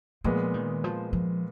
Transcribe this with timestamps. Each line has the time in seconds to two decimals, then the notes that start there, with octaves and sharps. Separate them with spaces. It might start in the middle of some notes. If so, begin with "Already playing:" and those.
0.24 A#2 F3 G#3 B3
0.54 D#3
0.84 F3
1.13 F3